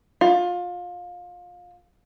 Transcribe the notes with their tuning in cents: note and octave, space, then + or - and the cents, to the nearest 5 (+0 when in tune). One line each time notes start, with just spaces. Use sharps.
F4 +25